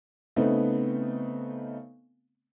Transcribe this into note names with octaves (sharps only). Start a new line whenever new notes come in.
C#3 A3 B3 C4 D#4